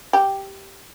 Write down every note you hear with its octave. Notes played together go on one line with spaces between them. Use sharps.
G4